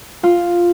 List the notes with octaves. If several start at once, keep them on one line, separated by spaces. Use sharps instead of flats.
F4